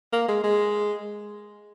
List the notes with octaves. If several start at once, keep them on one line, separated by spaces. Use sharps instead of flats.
A#3
G#3
G#3